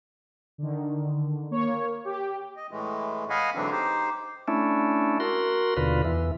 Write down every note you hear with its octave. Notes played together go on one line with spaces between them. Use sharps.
D3 D#3
A#3 C#5
G4
D#5
A2 E3 G#3 A3
D#5 F5 F#5 G#5 B5
G#2 D3 E3 F#3 C4 D4
D#4 G4 C5
A3 C#4 D4 E4
F#4 A#4 C6
D#2 B2 D3 F4 B4
E2 E3